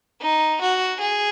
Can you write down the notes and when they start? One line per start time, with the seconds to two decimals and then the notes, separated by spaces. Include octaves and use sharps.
0.21 D#4
0.61 F#4
1.00 G#4